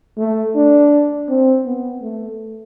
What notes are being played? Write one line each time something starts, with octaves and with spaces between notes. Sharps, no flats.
A3
D4
C4
B3
A3